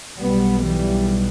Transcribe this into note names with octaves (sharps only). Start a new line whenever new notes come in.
B1 B2 G3 B3
E3 G3